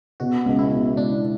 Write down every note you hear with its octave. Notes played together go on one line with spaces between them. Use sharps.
B2 F#4
C#2
E4
B2
C#2 D4